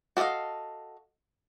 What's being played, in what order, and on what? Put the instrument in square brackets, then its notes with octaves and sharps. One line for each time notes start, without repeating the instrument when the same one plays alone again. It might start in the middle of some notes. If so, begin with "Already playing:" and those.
[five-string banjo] F#4 A4 D5 D#5 F5